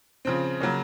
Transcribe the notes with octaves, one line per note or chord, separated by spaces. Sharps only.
C#3 F3 C4
C#3 F#3 A#3 C#4